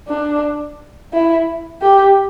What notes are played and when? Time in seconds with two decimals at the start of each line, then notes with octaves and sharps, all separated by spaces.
0.08 D4
1.13 E4
1.82 G4